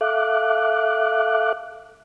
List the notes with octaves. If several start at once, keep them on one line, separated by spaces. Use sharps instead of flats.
A4 E5 F5 D6 F#6